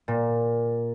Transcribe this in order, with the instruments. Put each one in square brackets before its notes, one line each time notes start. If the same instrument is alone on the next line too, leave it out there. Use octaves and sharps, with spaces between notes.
[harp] A#2